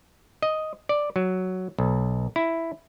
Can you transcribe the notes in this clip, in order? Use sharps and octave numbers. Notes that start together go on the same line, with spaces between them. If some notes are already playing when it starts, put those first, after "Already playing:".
D#5
D5
F#3
B1
E4